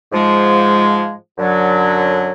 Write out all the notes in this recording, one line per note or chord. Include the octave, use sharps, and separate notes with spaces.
G#2 F3 G#3
F#2 D3 F#3